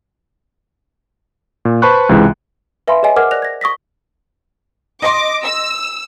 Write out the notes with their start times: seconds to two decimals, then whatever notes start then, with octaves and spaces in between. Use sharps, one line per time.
1.65 A#2
1.82 B4 C5 A5 B5 C#6 F#6
2.09 C#2 C3 E3 G#3
2.88 B4 E5 F5 G#5 B5 C6
3.03 G#4 C#5 D#5 G#5
3.16 A#4 C5 F#5 D6 F6 G#6
3.31 D5 F#6 A#6 F7
3.42 G#6 A#6
3.61 C#6 D#6 A#6 B6
5.02 D#5 C6 D6
5.44 E6